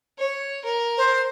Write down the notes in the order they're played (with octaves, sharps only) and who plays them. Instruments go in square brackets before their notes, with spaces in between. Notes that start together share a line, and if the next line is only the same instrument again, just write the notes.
[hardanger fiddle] C#5
A#4
[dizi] C5